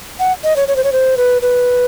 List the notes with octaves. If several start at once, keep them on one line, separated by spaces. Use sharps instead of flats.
F#5
D#5
C#5
C#5
C5
C#5
C5
B4
B4